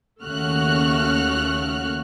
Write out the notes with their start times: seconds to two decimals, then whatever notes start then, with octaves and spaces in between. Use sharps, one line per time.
0.23 D#2 C#3 A3 F#4 F6 F#6